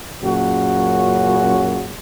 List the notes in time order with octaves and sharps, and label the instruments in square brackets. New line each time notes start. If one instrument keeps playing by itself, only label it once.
[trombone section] F#2 A#2 C#3 F#4